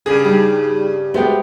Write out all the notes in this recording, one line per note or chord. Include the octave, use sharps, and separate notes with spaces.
G2 C#3 G#4
G3 D4 D#4
G#3 A3 B3 F#4 G4 C5